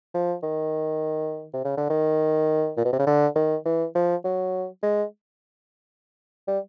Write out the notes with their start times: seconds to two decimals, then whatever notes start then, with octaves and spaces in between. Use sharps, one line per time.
0.14 F3
0.43 D#3
1.53 C3
1.65 C#3
1.77 D3
1.90 D#3
2.77 A#2
2.85 B2
2.93 C3
2.99 C#3
3.07 D3
3.36 D#3
3.65 E3
3.95 F3
4.25 F#3
4.83 G#3
6.48 G3